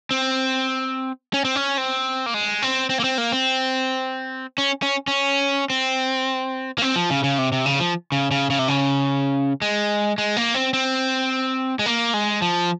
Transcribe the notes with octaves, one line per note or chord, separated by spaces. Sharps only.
C4
C#4
C4
C#4
C4
A#3
G#3
C4
C4
A#3
C4
A#3
C4
C#4
C#4
C#4
C4
A#3
C4
F3
C#3
C#3
C3
C3
C#3
F3
C#3
C#3
C#3
C3
C#3
G#3
G#3
A#3
C4
C4
G#3
A#3
G#3
F3